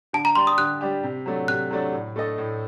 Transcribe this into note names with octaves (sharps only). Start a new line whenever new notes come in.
D3 A5
A#5
G3 D4 G4 C6
D#6
D3 F#6
G3 D4 G4
C3
F#3 A3 D4
C3 F#6
F#3 A3 D4
A2
A3 D4 A4 D#5
A2